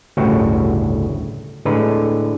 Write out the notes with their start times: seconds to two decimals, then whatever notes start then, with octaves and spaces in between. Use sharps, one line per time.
0.17 G1 D2 A2 C#3 F#4 G5
1.65 A2 D3 G#3 B4 A#5